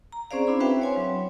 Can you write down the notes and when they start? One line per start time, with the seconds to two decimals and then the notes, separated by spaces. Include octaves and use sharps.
0.12 A#5
0.31 C4 C#4 G#4 C5 D5 F5
0.47 C4 D4 E4 B5
0.60 F#4 B4 C5 E5 F5 G5
0.82 C#5 G#5 C6
0.97 F#3